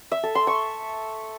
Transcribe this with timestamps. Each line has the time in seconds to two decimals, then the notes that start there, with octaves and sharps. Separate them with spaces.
0.12 E5
0.23 A4
0.35 C6
0.47 C#6